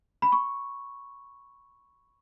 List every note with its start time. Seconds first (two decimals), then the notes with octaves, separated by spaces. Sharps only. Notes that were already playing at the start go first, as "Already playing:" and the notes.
0.22 B5
0.32 C#6